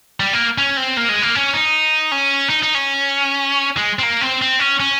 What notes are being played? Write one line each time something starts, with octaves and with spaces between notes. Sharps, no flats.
G3
A#3
C#4
C4
A#3
G#3
A#3
C#4
D#4
C#4
D#4
D#4
C#4
G#3
C4
A#3
C4
C4
C#4
C#4